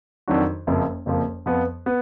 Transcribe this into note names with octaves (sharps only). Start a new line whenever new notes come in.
F2 D#3 F#3 D4 F#4
F#1 F2 F3 A#3
F#1 F2 F3 A#3
F2 F3 B3
B3